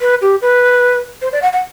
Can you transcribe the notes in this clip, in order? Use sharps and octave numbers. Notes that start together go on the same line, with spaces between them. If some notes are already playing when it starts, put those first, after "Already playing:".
B4
G4
B4
C5
D5
F#5
F#5